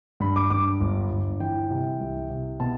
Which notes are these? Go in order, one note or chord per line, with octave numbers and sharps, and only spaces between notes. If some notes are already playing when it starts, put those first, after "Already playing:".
G2 B5
D6
G2 D6
G1
G1
E3 G5
C3
C2
C3
B2 A5